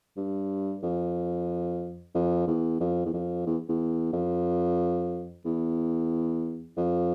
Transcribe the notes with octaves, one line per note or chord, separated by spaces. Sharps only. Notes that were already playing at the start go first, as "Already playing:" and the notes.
G2
F2
F2
E2
F2
E2
F2
E2
E2
F2
E2
F2